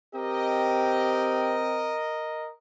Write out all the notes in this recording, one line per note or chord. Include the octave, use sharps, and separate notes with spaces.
C4 G4 A#4 D#5